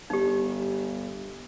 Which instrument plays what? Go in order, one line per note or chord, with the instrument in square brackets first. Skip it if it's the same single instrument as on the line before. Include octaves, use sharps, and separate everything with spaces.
[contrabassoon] G1 [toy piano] D#4 G4